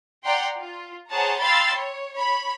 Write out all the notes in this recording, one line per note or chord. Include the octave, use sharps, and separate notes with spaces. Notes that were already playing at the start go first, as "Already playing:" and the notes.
D5 F#5 G5 A#5 C6
F4
G#4 C5 C#5 F#5 A5 A#5
F5 G5 B5 C6 E6 A6
C#5
C#5 B5